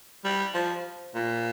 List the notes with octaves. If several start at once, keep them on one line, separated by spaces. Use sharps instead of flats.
G3
F3
A#2